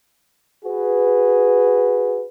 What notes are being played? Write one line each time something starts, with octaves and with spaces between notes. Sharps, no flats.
F#4 G#4 B4